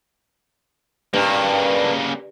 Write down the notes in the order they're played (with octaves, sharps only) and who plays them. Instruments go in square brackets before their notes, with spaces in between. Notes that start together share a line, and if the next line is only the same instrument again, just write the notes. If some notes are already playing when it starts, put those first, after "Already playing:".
[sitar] G2 [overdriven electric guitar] C#3 A#3